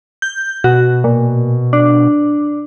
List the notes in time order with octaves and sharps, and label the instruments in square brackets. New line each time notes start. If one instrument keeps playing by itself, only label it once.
[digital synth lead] G6
[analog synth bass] B2 [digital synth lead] F#4
[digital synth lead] A#2
D4